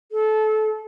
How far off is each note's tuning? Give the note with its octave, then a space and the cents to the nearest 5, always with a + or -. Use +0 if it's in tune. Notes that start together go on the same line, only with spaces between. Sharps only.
A4 -25